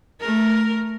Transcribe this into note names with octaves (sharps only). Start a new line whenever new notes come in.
A3 A#4